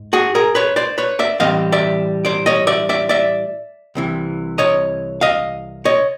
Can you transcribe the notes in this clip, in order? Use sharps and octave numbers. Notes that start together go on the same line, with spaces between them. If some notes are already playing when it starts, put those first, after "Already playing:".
Already playing: G#2
F#4 G#4
G#4 A#4
B4 C#5
C5 D5
B4 C#5
D5 E5
A2 E3 G3 C4 D#5 F5
D5 E5
C5 D5
C#5 D#5
D5 E5
D5 E5
D5 E5
C2 C3 E3
C#5 D#5
D#5 F5
C#5 D#5